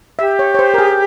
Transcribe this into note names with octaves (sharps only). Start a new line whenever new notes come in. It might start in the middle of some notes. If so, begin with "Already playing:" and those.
G4 E5
C#5
C#5
C5
A#4
G#4